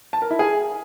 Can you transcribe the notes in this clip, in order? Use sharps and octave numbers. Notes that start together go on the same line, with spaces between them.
A5
A#4
E4
G#4